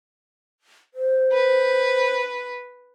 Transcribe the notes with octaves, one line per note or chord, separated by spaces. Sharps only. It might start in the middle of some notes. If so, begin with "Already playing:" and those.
C5
B4